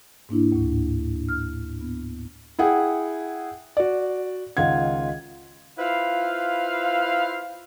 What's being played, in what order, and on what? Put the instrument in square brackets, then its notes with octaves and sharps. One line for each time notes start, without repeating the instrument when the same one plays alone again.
[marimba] G#2 A#3 D4 E4
D2 A2
F6
B3
[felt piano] E4 G#4 F#5 G5
F#4 D5
C#2 D#3 F4 F#5 G#6
[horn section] E4 F4 B4 C5 F5